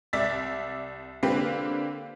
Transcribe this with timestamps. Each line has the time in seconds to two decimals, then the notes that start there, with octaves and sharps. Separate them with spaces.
0.13 C2 D5 E5 E6 A6 B6
1.23 D3 A#3 C4 F4 G4 B4